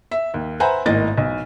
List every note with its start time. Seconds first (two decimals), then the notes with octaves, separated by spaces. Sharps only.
0.11 E5
0.34 D#2
0.60 B4 C5 E5 F#5 G#5 A#5
0.86 G#1 A2 A#3 D#5 A6
1.18 B1